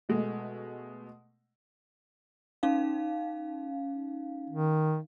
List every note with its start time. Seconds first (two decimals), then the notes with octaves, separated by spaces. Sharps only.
0.09 B2 G#3 A3
2.63 C#4 D#4 F5
4.50 D#3